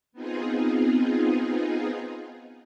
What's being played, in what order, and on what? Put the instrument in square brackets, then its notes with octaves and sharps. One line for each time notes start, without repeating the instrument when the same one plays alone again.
[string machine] B3 C4 D#4 F4 G#4